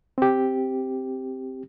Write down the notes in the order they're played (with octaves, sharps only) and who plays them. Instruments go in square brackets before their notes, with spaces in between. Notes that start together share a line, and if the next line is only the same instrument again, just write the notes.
[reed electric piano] C4 G4